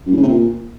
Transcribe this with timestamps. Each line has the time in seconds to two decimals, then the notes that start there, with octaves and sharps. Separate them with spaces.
0.07 F#2
0.12 A2
0.17 C#3
0.22 C3
0.28 A#2